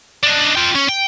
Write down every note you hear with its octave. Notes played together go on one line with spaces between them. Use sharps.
D4 D#4
F4 G5
C#4
G5